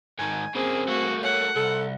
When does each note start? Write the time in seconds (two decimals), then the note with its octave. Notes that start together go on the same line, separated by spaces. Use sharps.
0.19 G#2 D#3 G#5
0.55 C#3 A#3 C4 G#4
0.88 A3 A#3 F#4
1.24 C#5 F#5
1.56 C2 A4